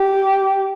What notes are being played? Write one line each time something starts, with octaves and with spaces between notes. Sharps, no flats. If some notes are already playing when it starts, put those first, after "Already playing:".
Already playing: G4